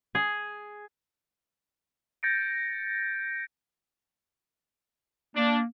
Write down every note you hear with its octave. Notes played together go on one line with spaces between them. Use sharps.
G#4
G6 A6 A#6 C#7 D7
A#3 D4